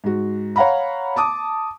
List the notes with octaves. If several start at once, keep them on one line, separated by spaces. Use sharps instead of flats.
G#2 F#4
C#5 F5 F#5 A#5 B5
A5 D6 D#6